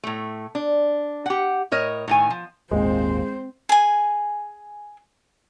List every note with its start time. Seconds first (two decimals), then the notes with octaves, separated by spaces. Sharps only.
0.04 A2 A3
0.55 D4
1.26 G4 F#5
1.71 A2 A#4 C#5 D#5
2.08 A2 D#3 G#5
2.30 F3
2.71 G#1 D#2 A#2 G#3 C4 C5
3.69 G#4 G#5